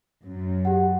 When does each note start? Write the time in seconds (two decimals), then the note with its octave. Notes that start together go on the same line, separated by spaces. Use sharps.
0.23 F#2
0.65 G4 F#5